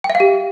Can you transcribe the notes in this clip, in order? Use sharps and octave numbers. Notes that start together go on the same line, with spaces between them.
G5
E5
F5
G4